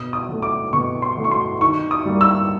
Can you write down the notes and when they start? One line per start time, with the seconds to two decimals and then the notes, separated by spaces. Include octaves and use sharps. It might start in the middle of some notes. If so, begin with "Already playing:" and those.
Already playing: B2 D#6
0.13 D#6
0.28 F#3 A3
0.42 D6
0.73 B2 C#6
1.02 C6
1.17 F#3 A3
1.24 C#6
1.31 C6
1.61 D#3 C#6
1.91 D#6
2.06 G3 A#3
2.21 E6